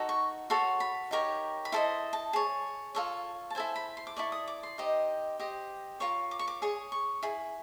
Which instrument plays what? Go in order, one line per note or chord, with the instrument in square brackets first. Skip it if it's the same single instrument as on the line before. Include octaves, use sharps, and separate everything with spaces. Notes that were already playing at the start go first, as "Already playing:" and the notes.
Already playing: [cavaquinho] D#4 F#4 A4
C#6
F#4 A4 C#5 C6
B5
D#4 G4 A#4 C#5
B5
E4 A4 C5 D#5 C6
A5
G#4 C#5
F4 A4 C#5
A5
E4 A4 C5 G#5
B5
C6
D6
E4 A4 D5 C#6
D#6
D6
C6
D#4 G4 C5 D#5
G4 C5 D#5
F4 A#4 C#5 C#6
D6
C#6
D6
G#4 C#5 C#6
C#6
E4 G#4